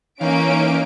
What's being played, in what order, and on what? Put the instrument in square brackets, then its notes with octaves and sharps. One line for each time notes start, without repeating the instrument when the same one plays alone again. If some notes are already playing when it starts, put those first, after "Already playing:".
[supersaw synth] E3 D#4 F5 [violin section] A#3 C#4 D7